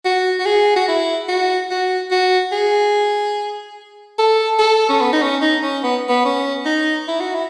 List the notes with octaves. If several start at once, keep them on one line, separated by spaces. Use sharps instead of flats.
F#4
F#4
G#4
F#4
E4
F#4
F#4
F#4
G#4
A4
A4
C#4
B3
D#4
C#4
D#4
C#4
B3
B3
C#4
D#4
E4
F#4
E4